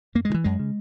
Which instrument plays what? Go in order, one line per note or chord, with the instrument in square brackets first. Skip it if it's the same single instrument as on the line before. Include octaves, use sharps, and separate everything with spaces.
[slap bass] F#2 A#3
G#3
C#3
E3
F#2 G#3
C#3